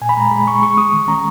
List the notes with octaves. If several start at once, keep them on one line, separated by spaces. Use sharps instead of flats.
A#2 G#5
B5
G#3 A#5
G#3 B5
G#3 C#6
G#3 C#6
G#3 D#6
D#3
C#4 A#5